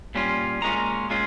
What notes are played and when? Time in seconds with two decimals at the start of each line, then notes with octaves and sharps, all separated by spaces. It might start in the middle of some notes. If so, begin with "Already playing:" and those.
0.15 A#2 G3 C#4 F4
0.62 A#2 G#3 C#4 F4 A#5
1.10 A#2 G#3 C#4 F4